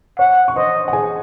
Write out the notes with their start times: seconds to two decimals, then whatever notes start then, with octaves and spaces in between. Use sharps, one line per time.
0.19 C#5 F#5 C#6
0.48 C#6
0.56 C5 D#5 C6
0.88 F#5
0.93 G#4 G#5